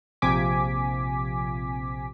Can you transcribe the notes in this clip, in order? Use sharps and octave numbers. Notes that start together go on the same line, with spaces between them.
A#1 C3 F3 G#5 D6 B6